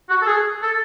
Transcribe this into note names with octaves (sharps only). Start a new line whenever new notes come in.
F#4
A4
G#4
A4